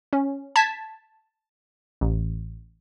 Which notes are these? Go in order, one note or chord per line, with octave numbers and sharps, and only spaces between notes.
C#4
A5 G#6 B6
A1